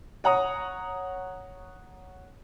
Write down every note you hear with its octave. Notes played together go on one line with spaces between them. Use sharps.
C#5 F#5 A#5 D#6